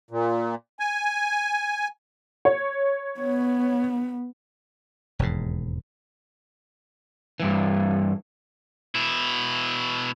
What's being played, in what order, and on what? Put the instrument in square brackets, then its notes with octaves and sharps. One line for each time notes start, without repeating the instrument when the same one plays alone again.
[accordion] A#2
G#5
[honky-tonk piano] C#5
[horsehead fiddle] B3
[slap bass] E1 D#2 G#2
[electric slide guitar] G2 E3
[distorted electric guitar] B2 E4